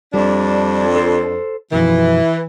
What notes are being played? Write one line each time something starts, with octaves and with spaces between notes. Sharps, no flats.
F2 G3 D4
A4 C5
B1 F#2 E3 F3